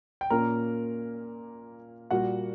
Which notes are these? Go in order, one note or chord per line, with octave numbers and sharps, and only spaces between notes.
G5
A#2 A#3 C#4 A#4 A#5
A#2 G3 A#3 F#4 F#5